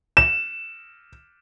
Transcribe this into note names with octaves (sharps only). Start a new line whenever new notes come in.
E7